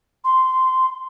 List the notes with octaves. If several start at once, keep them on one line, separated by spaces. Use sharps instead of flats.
C6